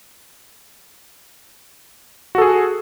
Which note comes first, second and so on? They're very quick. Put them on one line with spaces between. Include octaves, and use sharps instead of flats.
F#4 A4 G#4